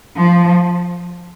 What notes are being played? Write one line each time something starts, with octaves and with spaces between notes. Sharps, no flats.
F3